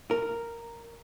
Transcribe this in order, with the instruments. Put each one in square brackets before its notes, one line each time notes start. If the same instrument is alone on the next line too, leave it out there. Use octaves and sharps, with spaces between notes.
[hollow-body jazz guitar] A#4